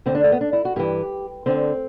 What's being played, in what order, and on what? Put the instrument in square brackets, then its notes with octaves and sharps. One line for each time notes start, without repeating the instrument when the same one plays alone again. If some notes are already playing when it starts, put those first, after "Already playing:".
[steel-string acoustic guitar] D2 D3 C4
D4
A3
B3
D4
E4
F#4
G2 E3 G4
D2 D3 C4